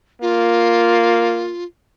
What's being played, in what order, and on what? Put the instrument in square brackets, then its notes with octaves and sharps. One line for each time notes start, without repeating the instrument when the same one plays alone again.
[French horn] A#3 [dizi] F4